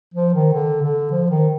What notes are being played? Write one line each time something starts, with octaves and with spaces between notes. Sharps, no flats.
F3
D#3
D3
D3
F3
D#3